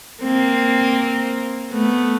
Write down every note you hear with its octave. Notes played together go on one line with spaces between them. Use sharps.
A#3 C4
A3 B3